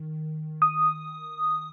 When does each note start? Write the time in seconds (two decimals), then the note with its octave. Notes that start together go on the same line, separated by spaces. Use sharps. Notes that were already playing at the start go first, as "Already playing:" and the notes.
Already playing: D#3
0.62 D#6